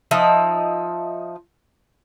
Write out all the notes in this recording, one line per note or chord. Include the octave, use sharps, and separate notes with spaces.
F3 D#4 E5